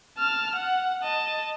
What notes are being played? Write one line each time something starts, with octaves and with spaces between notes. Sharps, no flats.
A5 F6
F#5
D#5 A5